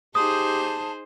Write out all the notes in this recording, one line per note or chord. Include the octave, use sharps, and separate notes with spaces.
D#4 G4 G#4 C5 A5 D#6